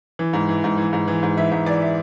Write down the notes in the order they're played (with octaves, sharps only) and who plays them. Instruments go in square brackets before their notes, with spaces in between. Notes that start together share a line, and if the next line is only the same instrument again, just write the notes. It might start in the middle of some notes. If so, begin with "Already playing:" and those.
[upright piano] E3
G#2
E3
G#2
E3
G#2
E3
G#2
E3 E5
G#2 E5
E3 D5
E5